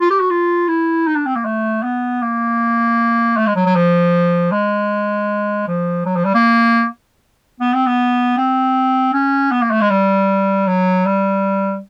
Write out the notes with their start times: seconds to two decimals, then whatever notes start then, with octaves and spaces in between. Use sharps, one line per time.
0.01 F4
0.10 G4
0.20 F#4
0.30 F4
0.68 E4
1.06 D#4
1.16 D4
1.26 C4
1.36 A#3
1.45 A3
1.83 B3
2.22 A#3
3.37 A3
3.47 G#3
3.56 F#3
3.66 F#3
3.75 F3
4.52 G#3
5.68 F3
6.06 F#3
6.16 F3
6.25 G3
6.34 A#3
7.60 B3
7.74 C4
7.87 B3
8.37 C4
9.13 C#4
9.51 B3
9.61 A#3
9.71 A3
9.81 G#3
9.90 G3
10.67 F#3
11.06 G3